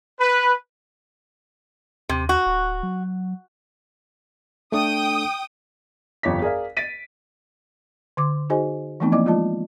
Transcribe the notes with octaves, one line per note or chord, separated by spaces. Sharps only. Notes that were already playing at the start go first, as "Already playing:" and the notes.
B4
D#2 C3
F#4
D1
F#3
A3 D4 A4 G5 D#6
G1 F2 F3 C#5 D6 B6
G#4 A#4 D5 F5
A6 B6 D7 D#7
D3 C6 D6
D#4 F#4 G#4 C5 D#5 G#5
E3 F3 A3 B3 C4 D#4
F3 A#3 E4 D5 D#5 D6
F3 G#3 F4 D5 D#5 A5